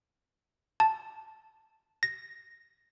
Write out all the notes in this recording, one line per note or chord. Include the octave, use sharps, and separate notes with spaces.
A5
A#6